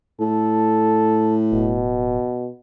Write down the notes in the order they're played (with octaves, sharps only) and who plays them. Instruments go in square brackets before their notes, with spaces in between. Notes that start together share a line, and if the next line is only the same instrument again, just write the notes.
[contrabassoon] A2 [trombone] A4
[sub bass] D1 [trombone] B2